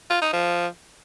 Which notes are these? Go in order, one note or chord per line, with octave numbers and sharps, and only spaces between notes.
F4
D#4
F3